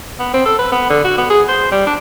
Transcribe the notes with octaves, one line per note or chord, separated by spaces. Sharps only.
B3
C4
A4
B4
B3
D3
F#4
B3
G#4
C5
G3
D4